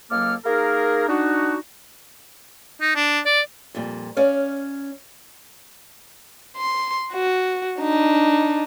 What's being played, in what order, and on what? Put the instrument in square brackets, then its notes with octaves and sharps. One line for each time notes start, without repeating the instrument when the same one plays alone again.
[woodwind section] C#2 F#3 A#3 A4 D6 F6
A#3 D#4 G#4 A#4
D4 D#4 F#4
[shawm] D#4
D4
D5
[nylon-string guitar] F2 A#2 G3
C#4 D5 F5
[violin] C6
F#4
D4 D#4